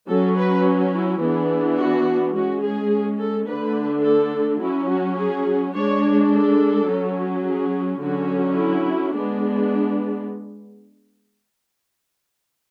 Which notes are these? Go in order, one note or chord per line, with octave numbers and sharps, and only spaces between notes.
F#3 C#4 A4
B4
E4
E3 B3 D4 G#4
F#4
G#3 C#4 F#4
G#4
A4
D3 A3 D4 B4
A4
F#3 C#4 E4
F#4
G#4
G#3 D4 C#5
A4
F#3 C#4
G#4
D3 F#3 C#4 F#4
E4
G#3 B3 D4